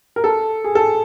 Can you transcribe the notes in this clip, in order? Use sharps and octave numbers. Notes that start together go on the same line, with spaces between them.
A#4
A4
G#4
A4